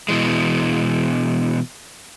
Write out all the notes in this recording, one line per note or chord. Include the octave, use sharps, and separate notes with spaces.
B2 E3 G#3